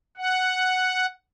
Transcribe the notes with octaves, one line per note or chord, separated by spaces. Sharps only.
F#5